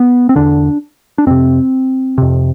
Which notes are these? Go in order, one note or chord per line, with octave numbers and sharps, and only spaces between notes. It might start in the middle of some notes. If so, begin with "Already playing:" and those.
Already playing: B3
C4
E2 D3 D4
D4
F2 C3 C4
F2 C3